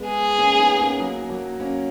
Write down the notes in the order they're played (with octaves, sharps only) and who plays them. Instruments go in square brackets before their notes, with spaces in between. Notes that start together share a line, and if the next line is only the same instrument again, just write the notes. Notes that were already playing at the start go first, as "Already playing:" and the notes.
Already playing: [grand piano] G#3 B3
[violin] G#4
[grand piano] A#3 C#4
B3 D#4
A#3 C#4
F#3 A#3
F#3 A#3
A#3 C#4